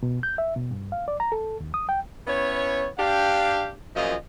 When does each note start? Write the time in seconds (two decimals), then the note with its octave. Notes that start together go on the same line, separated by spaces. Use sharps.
0.03 B2
0.23 G6
0.38 E5
0.56 B2
0.71 G2
0.92 F5
1.08 D5
1.20 A#5
1.32 A4
1.60 D#2
1.74 D#6
1.89 G5
2.27 B3 C#4 E4 C#5
2.98 D4 G4 F5
3.95 F#2 A#2 F3 F4 G#4 D#5